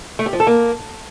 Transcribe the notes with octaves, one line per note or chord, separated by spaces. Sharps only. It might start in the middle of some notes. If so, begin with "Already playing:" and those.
A3
G4
F3
A4
A#3